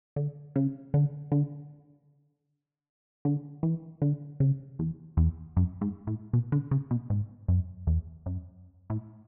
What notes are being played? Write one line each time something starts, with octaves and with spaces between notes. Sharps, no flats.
D3
C#3
D3
D3
D3
E3
D3
C#3
E2
E2
F#2
G#2
A2
B2
D3
C#3
B2
G#2
F#2
E2
F#2
A2